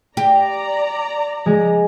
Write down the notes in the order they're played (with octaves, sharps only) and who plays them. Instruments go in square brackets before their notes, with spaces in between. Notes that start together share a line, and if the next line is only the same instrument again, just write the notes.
[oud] G4 [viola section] D5 A#5
[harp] G#3